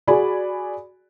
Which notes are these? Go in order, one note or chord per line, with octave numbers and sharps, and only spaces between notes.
F#4 G#4 D5 G#5 B5